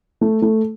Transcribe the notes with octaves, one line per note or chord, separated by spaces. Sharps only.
A3
A3